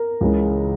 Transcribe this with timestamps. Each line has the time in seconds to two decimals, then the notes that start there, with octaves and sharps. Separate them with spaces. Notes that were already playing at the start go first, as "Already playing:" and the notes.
Already playing: A#4
0.21 C#2 C#3 E3 G#3